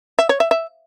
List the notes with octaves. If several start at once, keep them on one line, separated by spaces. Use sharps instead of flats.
E5
C#5
E5
E5